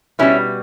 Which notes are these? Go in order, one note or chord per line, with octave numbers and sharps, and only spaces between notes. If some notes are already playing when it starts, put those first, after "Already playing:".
B2 G3 C#4 E4